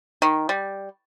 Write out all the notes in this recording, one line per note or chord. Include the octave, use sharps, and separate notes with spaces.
D#3
G3